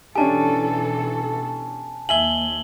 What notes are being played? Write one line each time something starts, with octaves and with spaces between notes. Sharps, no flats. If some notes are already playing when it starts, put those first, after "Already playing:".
B2 E3 C#4 D4 G4 A4 G#5 A5
D#2 E5 G#5 F#7 G7